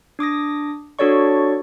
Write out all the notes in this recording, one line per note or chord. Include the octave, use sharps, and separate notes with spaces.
D4 D6 D#6 A#6
D4 F#4 A4 C#5 D5 C#6